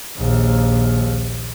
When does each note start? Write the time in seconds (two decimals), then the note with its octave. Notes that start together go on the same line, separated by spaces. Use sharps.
0.17 A#1 D#2